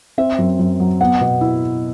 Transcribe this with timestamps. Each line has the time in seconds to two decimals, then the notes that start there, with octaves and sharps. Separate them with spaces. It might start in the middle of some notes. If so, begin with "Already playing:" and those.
0.18 C4 E5
0.38 F#2
0.59 F#2
0.80 F#3
1.01 B3 F#5
1.21 B2
1.41 E4